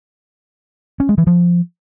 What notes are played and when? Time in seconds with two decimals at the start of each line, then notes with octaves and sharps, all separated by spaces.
1.00 C#4
1.09 G#3
1.18 E3
1.27 F3